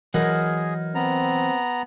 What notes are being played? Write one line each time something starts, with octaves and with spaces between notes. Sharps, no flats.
E3 F#3 D#4 G#4 A#4 F#5
B3 C4 A#5